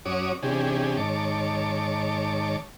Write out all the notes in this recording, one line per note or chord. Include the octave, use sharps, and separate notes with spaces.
F#2 C#4 F#4 C#5 D6 D#6
C3 E3 C#4 D4 G4 G#4
G#2 D#3 C#5 A5 D6